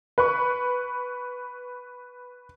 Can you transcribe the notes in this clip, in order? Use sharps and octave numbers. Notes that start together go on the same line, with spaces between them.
B4 C#6